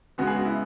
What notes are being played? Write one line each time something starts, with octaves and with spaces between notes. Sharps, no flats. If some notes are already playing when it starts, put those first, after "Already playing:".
C#3 G#3 B3 F#4
G#4
F#4
E4